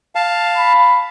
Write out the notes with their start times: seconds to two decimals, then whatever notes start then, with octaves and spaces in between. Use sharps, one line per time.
0.15 F5 A5
0.57 B5